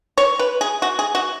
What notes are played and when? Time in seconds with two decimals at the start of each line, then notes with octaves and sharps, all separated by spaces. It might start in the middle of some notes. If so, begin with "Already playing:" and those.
0.18 C#5
0.39 B4
0.61 G#4
0.82 F#4
0.99 G#4
1.15 F#4